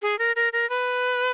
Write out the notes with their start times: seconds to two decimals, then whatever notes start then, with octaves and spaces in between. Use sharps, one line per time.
0.02 G#4
0.19 A#4
0.36 A#4
0.53 A#4
0.70 B4